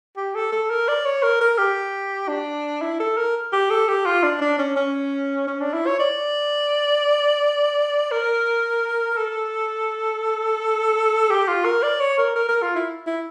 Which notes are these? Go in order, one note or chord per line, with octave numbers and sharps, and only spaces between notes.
G4
A4
A4
A#4
D5
C#5
A#4
A#4
G4
D4
E4
A4
A#4
G4
A4
G4
F4
D4
D4
C#4
C#4
C#4
D4
E4
C#5
D5
A#4
A4
G4
F4
A#4
D5
C#5
A#4
A#4
A#4
F4
E4
E4